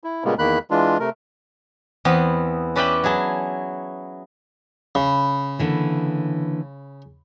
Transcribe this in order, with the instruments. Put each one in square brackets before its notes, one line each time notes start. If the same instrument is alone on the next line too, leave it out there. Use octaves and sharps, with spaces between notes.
[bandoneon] E4
A#2 C#3 G3 G#3 A#3 B3
E2 D#3 A#3 B5 F#6
E3 G#3 D4 F4
C3 A3 A#4
[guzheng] E2 B3 C4
C#4 B4 D5 E5 G5 B5
F#3 E4 G#4 A5
[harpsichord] C#3 [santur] B5
[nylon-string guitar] D3 E3 A#3